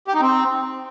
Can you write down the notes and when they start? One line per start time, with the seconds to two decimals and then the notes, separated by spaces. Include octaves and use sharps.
0.08 G4
0.14 D#4
0.21 C4